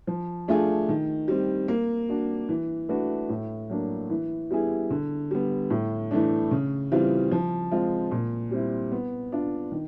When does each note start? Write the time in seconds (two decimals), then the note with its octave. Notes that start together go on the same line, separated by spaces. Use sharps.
0.07 F3
0.48 A3 D4 F4 G#4
0.89 D#3
1.28 G3 C4
1.68 A#3
2.09 D4 F#4
2.49 E3
2.89 A3 D4 F#4 B4
3.29 A2
3.70 F#3 A#3 D4
4.10 E3
4.51 G3 B3 E4 G#4
4.90 D3
5.31 G3 B3
5.70 A2
6.11 E3 A3 D4
6.51 C#3
6.92 E3 G3 C4 F4
7.31 F3
7.71 G#3 C4 F4
8.11 A#2
8.51 G3 C4 E4
8.92 B3
9.32 D4 F4
9.72 D#3